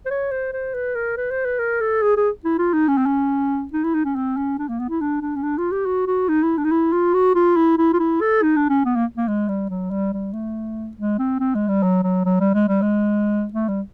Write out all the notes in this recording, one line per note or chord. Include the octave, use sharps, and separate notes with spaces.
C5
C#5
C5
C5
B4
A#4
B4
C5
B4
A#4
A4
G#4
G#4
E4
F4
D#4
C#4
C4
C#4
D#4
E4
D#4
C#4
C4
C#4
D4
A#3
B3
E4
D4
D4
C#4
D4
F4
G4
F#4
F#4
D#4
E4
D4
D#4
E4
F4
F#4
F4
E4
E4
F4
E4
A4
D#4
D4
C#4
B3
A#3
A#3
G#3
G3
F#3
G3
G3
A3
G#3
C4
C4
G#3
G3
F#3
F#3
F#3
G3
G#3
G3
G#3
A3
G3